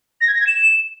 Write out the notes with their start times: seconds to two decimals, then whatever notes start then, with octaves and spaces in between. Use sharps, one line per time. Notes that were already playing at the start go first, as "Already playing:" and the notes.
0.21 A#6
0.28 G#6
0.34 A#6
0.41 G#6
0.47 E7